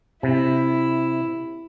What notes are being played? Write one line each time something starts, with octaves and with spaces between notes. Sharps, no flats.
C3 E4